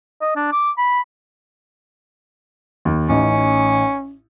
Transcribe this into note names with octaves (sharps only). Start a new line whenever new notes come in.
D#5
D4
D6
B5
D#2
A1 C#4 D#4